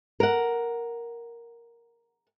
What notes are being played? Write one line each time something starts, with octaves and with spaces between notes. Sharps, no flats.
A#4 F#5